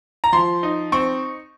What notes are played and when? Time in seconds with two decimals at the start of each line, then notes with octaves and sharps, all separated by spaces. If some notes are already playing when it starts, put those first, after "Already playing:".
0.24 A#5
0.33 F3 C6
0.63 D#4
0.92 C4 C#6